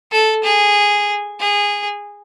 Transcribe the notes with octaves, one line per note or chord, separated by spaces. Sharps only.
A4
G#4
G#4